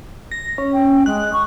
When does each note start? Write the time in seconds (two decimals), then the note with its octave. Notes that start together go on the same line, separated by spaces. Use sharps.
0.32 A#6
0.58 C#4
0.73 G5
1.06 G#3 F#6
1.33 C#6